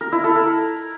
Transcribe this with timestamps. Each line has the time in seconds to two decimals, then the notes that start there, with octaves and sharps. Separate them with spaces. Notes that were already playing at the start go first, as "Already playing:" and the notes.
0.01 A#4
0.12 E4
0.24 A4
0.35 A#4